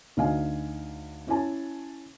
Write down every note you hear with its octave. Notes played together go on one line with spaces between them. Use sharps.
D2 D#4 D#5 F5 G#5
C#4 E4 C#5 G#5 A5